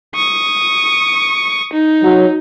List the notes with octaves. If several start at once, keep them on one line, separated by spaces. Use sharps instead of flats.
C#6 D#6
D#4
F#3